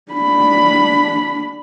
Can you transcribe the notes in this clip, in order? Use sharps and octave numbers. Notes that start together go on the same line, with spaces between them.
D4 B5